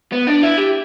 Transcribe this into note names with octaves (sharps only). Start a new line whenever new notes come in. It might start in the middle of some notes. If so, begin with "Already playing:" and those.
B3
D4
E4
G4